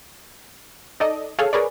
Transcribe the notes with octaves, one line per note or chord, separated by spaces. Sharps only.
D#4 A4 D5 D#5
G#4 A4 C#5 F5
G#4 A#4 B4 C#5 D5